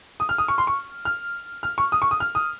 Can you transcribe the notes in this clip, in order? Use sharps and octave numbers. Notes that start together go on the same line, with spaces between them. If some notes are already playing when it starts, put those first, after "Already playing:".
D#6
F6
D#6
C#6
C6
C#6
F6
F6
C#6
D#6
C#6
D#6
F6
D#6